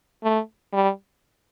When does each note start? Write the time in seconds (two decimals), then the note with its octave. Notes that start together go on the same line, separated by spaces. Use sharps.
0.24 A3
0.73 G3